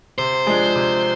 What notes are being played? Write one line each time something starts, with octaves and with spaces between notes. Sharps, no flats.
C3 C5
F3 G#3 D4 G#4
C3